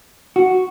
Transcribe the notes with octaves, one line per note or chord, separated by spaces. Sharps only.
F#4